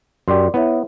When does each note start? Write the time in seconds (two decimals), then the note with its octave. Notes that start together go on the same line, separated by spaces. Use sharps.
0.28 F#2 G4 D5 C6
0.54 B3 E4 C#5 E5